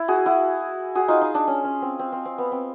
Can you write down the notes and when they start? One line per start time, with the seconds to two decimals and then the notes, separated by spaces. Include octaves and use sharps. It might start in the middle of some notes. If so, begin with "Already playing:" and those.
Already playing: E4
0.08 F#4 G#4
0.26 E4 F#4
0.95 F#4 G#4
1.08 D#4 F4
1.21 D#4
1.34 D4
1.47 C#4
1.65 C#4
1.82 C4
1.99 C4
2.12 C4
2.26 C4
2.38 B3
2.52 C4